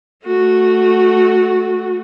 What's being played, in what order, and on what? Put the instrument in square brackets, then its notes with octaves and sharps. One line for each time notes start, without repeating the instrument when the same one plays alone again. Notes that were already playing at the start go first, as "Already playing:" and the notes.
[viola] A3 F#4